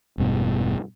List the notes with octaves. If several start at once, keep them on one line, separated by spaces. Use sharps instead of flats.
E1 G2 B2